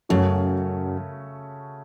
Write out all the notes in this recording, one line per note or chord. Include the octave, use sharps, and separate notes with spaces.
F#2 C#3 A3 C#4 F#4